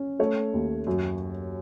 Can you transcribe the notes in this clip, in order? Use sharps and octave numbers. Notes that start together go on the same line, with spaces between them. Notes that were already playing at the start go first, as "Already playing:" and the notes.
Already playing: C#4
A3 C#5
D#2
F#2